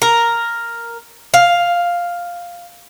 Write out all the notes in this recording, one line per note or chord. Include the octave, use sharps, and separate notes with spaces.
A#4
F5